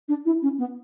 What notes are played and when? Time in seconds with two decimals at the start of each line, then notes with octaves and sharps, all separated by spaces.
0.08 D4
0.25 E4
0.42 C#4
0.58 B3